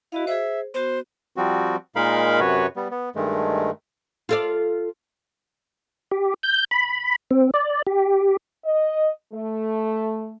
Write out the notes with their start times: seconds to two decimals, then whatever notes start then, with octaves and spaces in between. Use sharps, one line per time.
0.12 E4 F#4 D#5 F5
0.27 G#4 C5 E5
0.74 B3 F#4 C5
1.36 F3 G3 C4 F#4
1.96 A#2 G#3 D#4 A#4 F5 B5
2.40 F#2 C3 F#4 B4 C#5
2.76 G3 B3
2.91 B3
3.16 G2 D#3 G#3 A3
4.29 F4 A4 D5
6.11 G4
6.43 G6
6.71 B5
7.31 C4
7.54 D5
7.87 G4
8.65 D#5
9.33 A3